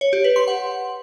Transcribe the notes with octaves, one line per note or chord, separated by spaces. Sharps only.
C#5
G4
B4
C6
F#5